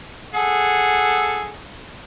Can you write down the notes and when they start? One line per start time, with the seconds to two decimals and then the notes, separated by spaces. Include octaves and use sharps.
0.34 G#4 A4 F#5